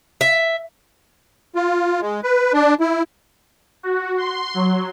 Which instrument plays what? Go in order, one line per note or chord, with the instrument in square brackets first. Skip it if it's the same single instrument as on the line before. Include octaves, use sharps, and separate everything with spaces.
[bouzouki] E5
[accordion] F4
G#3
B4
D4
E4
[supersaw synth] F#4
C6
F#3